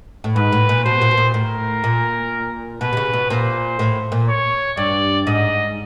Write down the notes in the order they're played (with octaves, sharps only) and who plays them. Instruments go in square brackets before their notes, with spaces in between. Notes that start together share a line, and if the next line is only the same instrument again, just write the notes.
[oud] A2
[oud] G#2 [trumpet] B4
[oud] A2
A#2
[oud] B2 [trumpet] C5
[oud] A#2
B2
A#2
[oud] A2 [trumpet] A#4
[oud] A#2
[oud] B2 [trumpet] B4
[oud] C3
C#3
B2
[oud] A#2 [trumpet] C5
[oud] A2
A#2
[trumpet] C#5
[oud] G2 [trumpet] D5
[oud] G#2 [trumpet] D#5